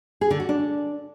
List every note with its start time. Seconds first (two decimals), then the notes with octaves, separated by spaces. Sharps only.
0.21 G#4
0.31 D3
0.40 F#4
0.49 D4